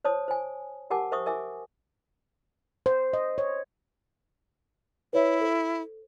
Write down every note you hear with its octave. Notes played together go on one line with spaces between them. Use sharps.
C5 C#5 A5 D#6
C5 G#5
G4 A#4 F#5 G#5 A5 D6
A#4 C5 E5 C#6 D#6
A#4 E5 G#5 D6
C5
D#5
C#5
E4 B4 C#5 E5
A4 C5